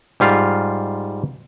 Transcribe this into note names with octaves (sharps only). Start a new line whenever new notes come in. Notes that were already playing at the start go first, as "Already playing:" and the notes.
G#2 G3 F4 F5